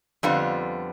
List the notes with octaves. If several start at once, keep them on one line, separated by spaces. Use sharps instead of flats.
F2 D3 G3 B3 F4